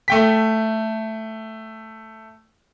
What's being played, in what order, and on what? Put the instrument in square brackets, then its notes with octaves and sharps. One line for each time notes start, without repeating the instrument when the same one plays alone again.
[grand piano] A3 G5 B6